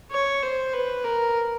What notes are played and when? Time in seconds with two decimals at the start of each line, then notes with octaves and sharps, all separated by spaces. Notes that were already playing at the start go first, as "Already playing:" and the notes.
0.11 C#5
0.42 C5
0.73 B4
1.04 A#4